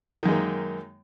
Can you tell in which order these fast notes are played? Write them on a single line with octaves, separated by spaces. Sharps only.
D#3 F#2 G#3 A#3